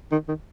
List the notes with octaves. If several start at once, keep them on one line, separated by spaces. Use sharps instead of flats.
D#3
D#3